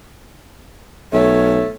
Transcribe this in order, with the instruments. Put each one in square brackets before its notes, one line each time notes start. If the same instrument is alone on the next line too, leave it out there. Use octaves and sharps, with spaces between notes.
[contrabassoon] B1 [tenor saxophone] A3 [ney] C#5